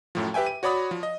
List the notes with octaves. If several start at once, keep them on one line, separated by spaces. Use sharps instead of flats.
F#2 A2 F3
G4 B4 E5 G5 G#5
D#7
F#4 C#5 D5 B5 D#6
F3
D#5